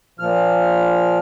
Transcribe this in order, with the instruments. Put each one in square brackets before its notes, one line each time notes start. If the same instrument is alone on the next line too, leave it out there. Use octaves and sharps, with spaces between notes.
[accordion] A#2 F3 F6